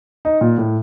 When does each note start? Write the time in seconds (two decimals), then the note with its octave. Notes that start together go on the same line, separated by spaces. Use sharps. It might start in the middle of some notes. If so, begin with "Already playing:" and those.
0.25 D#4
0.41 A#2
0.58 A2